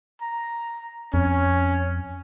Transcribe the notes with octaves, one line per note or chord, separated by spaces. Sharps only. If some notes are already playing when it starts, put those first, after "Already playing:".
A#5
F2 C#4